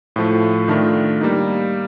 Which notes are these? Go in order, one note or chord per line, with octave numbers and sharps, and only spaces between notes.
A2 F3 A3
D#3 A3 D4 F4 A#4
G3 A#3 D#4